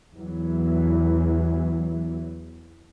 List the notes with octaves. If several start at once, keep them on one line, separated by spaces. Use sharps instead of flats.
E2 E3 F#3